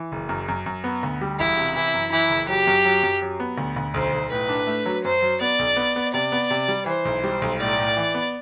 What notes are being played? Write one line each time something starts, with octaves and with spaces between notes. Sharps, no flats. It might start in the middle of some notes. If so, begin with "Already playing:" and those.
Already playing: E3
F#1
F#2
F#2
F#2
B3
D2
G3
E1 E4
C3
E3 E4
F#2
E3 E4
F#1
F#3 G4
F#2
F#3
F#2
F#3
B3
D2
D2
B1 C5
B1
A2 B4
D4
A3
F#3
F#2 C5
F#3
B3 D5
B1
B3
B3
C3 D5
B3
C3
G3
E3 C5
B1
G3
B1
A2 D5
A2
E3
B3